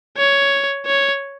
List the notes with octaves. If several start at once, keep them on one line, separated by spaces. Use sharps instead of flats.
C#5
C#5